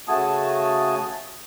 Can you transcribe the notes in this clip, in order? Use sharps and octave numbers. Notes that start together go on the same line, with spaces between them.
C#3 A3 F#4 G#5 A5 D#6